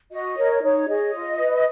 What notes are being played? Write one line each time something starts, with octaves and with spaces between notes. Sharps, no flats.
F#4 D#5
A#4 C#5
D#4 C#5
G#4 C#5 D#5
F4
B4